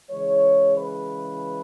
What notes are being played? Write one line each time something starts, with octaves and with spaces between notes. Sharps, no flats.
C#3 E3 G#3 C#5
B4